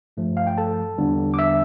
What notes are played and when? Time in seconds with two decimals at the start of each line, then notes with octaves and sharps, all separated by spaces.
0.17 G2 F3 A3
0.37 F5
0.47 G5
0.58 A4 A5
0.98 E2 D3 G3 B3 D4
1.34 D6
1.39 E5 E6